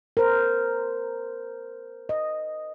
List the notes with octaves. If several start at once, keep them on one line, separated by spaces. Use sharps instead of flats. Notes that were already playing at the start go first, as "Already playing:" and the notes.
A#4 C5
D#5